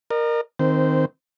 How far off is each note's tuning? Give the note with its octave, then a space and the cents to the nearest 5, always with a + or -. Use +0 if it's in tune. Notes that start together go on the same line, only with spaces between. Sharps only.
A#4 +0 D#5 -45
D#3 +0 C4 +0 C5 -20